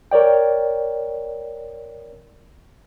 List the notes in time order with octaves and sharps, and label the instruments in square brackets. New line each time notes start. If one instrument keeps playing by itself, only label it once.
[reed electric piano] A#4 C#5 D5 G5